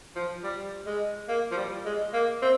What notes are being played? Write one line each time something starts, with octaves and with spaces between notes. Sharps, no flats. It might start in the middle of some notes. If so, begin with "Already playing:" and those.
F3
G3
G#3
A#3
F3
G3
G#3
A#3
C4